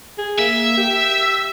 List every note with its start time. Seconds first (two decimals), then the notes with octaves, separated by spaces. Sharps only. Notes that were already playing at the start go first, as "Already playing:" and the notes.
0.18 G#4
0.39 A#3 E5
0.78 G4